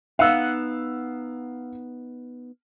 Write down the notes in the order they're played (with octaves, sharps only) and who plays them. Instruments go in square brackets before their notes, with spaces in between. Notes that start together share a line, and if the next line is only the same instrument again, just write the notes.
[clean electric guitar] B3 D#4 F#5 [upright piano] F5 E6